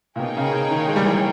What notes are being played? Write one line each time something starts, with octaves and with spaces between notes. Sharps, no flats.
A#2
B2 A#3 D#4 G#4 C#5 G5
C#3
C#3
D#3
G#3
G3
E3
G3